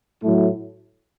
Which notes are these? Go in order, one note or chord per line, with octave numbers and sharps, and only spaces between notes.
A2 F#3 A3 E4